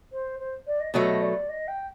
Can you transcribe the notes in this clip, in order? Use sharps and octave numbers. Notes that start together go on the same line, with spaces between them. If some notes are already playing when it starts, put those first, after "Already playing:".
C5
C5
D5
D#5
B2 F#3 A3 D#5
D5
D#5
G5